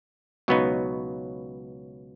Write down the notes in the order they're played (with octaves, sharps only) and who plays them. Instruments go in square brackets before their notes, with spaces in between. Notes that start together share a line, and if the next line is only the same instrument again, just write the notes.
[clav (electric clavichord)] C#2 B2 F#3 B3 D#4